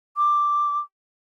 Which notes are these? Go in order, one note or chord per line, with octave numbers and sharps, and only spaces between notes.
D6